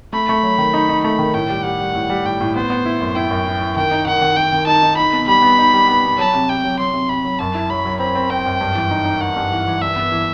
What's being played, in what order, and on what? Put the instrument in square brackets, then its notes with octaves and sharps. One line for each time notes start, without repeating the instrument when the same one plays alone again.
[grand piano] A3 [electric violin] B5
[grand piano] A3
F#3
D#3
D#4
D#4
[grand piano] A3 [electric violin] B5
[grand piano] D#3
[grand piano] A2 [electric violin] G5
[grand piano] G3
[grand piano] G3 [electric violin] F#5
[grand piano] G3
A2
G3
[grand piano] A2 [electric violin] G5
[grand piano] A2
[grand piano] B3 [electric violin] C5
[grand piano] B3
E4
F#2
[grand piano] E4 [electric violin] G5
[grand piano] F#2
E4
E4
[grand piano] D#3 [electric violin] G5
[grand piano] D#4
[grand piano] D#3 [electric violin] F#5
[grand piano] D#3
[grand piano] D#3 [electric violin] G5
[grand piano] D#3
[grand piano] D#4 [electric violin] A5
[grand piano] D#4
[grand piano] D#4 [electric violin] B5
[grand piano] B2
[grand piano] G3 [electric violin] B5
[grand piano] B3
D#4
G3
B3
B2
[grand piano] F#3 [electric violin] A5
[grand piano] C3
[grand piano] C3 [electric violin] G5
[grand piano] F#3
[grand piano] F#3 [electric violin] C6
[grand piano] C3
[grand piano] C3 [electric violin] B5
[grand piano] F#3
[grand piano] F#2 [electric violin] A5
[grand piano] E4
[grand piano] F#3 [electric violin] B5
[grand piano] F#3
[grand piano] C4 [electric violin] B5
[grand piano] C4
[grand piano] C4 [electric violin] G5
[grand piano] F#2
G2
E3
D#4
D#4
[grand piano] D#4 [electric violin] F#5
[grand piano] G2
E3
E3
[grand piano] G2 [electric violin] E5
[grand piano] B3
E3